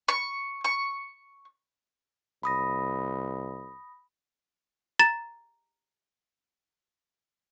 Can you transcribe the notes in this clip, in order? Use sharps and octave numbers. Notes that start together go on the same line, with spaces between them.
C#6
C#6
C2 B5 D#6 A#6
A#5 A6 E7